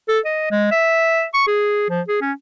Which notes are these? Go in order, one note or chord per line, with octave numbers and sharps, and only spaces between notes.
A4
D#5
G#3
E5
C#6
G#4
F3
G#4
C#4